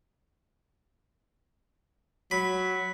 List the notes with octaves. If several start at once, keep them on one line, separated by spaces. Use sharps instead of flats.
F#3 B5